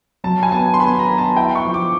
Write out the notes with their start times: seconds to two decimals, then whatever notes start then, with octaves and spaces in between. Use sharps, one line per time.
0.24 F#3 A5
0.43 G#5
0.52 B3 A5
0.74 C6
0.80 B3 B5
0.99 A#5
1.09 B3
1.18 A5
1.36 E4 G5
1.55 C#6
1.65 F3
1.74 D6